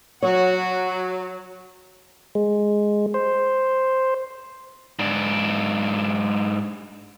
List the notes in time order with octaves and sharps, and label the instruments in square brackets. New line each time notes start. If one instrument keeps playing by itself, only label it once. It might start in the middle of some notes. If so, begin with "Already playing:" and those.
[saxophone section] F#3 [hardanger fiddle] F#4 F#5 [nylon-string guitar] C#5
[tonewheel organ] G#3
C5
[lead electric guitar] G#2 D4